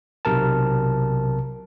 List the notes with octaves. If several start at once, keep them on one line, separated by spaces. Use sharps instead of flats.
B1 C3 A#4 A5